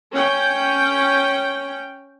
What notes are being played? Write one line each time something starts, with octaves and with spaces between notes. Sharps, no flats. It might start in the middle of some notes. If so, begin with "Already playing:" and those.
C#4 G5